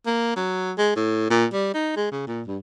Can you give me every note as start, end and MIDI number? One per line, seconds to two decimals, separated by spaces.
0.06 0.35 58
0.36 0.73 54
0.78 0.92 56
0.96 1.29 45
1.30 1.46 46
1.53 1.74 55
1.74 1.94 63
1.96 2.07 56
2.12 2.27 49
2.27 2.42 46
2.47 2.58 43